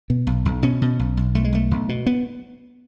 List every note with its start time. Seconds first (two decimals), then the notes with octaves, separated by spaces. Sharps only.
0.10 B2
0.27 B1
0.45 B1
0.63 B2 C#4
0.82 B2
0.99 B1
1.17 B1
1.35 B1 A3
1.44 G#3
1.52 B1 A3
1.71 B1
1.89 B2
2.06 B3